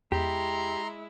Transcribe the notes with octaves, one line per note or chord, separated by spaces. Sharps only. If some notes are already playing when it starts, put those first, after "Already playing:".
E2 G#3 E4 G4 A#5 C6